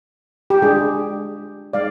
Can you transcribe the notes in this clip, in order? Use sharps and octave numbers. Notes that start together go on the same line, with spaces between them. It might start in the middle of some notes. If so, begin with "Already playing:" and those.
G4
G#3 D4 F4 G#4
G#3 D#4 D5 F5